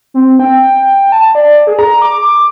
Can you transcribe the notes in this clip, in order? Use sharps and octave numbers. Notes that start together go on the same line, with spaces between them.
C4
G5
A5
D5
G#4
A#5
D6